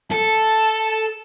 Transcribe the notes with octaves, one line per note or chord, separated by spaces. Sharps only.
A4 A5